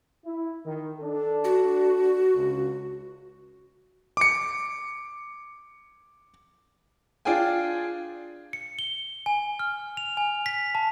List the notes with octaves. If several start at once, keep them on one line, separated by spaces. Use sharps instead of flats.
E4
D#3
D4 A4
F#4
C#2
D6 C#7
D4 F4 G#4 G5 G#5
C#7
G7
G#5
F6
F7
G#5
B6
A5